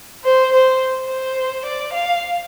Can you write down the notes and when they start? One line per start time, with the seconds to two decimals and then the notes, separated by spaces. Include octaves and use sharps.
0.24 C5
0.52 C5
1.09 C5
1.65 D5
1.93 F5